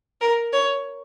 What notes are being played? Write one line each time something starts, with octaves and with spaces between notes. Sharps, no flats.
A#4
C#5